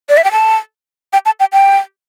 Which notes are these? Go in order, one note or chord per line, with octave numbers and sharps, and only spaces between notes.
D5
E5
G5
A5
G5
A5
G5
G5